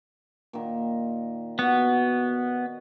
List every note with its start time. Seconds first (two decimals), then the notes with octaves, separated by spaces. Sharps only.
0.53 A#2 D#3
1.59 B3 F#4